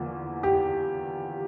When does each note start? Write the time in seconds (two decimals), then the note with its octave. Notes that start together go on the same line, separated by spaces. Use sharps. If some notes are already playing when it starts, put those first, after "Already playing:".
Already playing: E2 D3 F3 A#3
0.43 G4